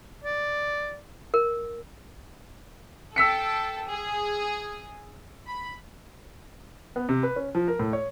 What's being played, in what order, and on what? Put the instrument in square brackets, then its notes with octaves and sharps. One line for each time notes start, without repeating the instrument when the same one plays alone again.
[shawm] D5
[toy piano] A#4
[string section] A4 G5 [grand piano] E6 B6 C#7
[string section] G#4
B5
[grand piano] B3
C3
B4
C#4
F3
A#4
A2
C#5